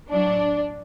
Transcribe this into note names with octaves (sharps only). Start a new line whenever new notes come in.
A2 F#3 D4